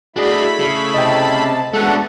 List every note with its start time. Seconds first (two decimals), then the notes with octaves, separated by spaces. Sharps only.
0.16 A3 D4 E4 F#4 G#4 D5 D#5 B5
0.60 C#3
0.94 C3 D#5 G5 A5
1.74 G#3 A3 B3 C#4 D4 F#4 A4 F#5